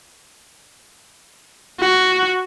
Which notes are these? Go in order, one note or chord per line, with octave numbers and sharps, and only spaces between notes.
F#4